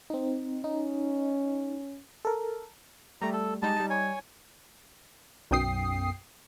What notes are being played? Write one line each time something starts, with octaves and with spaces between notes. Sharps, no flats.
C4 D#4
C#4 D#4
A4 A#4
G3 A3 A#5
A4
G3 G#3 D#4 A5
G3 D#4
C#5 G#5
B1 F#2 G5 D#6 C7